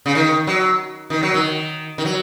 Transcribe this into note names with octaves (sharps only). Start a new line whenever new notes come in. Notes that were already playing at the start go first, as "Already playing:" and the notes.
C#3
D#3
F#3
D#3
F#3
D#3
D#3
F#3